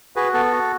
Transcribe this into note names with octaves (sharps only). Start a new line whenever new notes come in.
F#4 G#4 B4
B3 A4
F#4